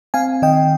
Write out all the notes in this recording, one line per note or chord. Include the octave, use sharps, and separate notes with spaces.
C4 F5 G#5
D#3 D#5 G5